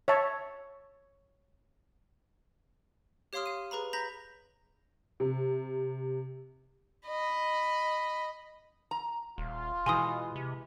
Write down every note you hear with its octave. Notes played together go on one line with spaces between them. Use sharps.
C#5 E5 A5
G4 C#5 F5 C6 D#6 F6
F5 D#7
G#4 B4 A#5 B5
A#5 B5 G6 A#6 B6
C3
D#5 B5
A#5
D#1 F4
B2 E3 G#3 G#5 C6 D#6
C3